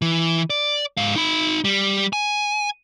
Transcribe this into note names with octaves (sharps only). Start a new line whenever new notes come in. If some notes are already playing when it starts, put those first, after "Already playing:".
E3
D5
G#2 F5
D#4 B5
G3
G#5